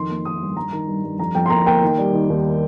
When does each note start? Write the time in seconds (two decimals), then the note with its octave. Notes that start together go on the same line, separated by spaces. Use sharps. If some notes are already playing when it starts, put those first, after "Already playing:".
Already playing: F2 D#3 C6
0.09 A#3
0.25 D#3 D#6
0.41 G2
0.56 G2 A#5
0.72 D#3
0.87 G2
1.03 G2
1.19 F2 A#5
1.35 F2 G5
1.46 C6
1.50 A#3 A#5
1.66 A#3 G5
1.82 D#3
1.98 G3
2.13 D#3
2.30 D#2